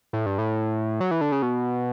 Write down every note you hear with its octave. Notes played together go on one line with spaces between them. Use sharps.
A2
G2
A2
F#3
E3
D3
C#3
B2